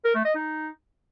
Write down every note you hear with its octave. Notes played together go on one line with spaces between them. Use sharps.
A#4
A3
D#5
D#4